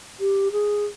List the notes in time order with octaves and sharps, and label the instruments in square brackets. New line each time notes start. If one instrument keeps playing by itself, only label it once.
[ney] G4
G#4